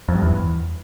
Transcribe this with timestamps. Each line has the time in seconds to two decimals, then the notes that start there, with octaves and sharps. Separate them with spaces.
0.09 F2
0.15 G2
0.22 E2